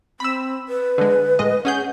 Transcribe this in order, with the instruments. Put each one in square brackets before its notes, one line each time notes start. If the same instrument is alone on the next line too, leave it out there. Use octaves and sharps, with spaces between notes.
[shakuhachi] C4 [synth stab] B5 E6
[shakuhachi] B4
[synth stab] D3 G#3
A2 G#3 D#5
[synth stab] C#4 G#4 G6 [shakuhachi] F#5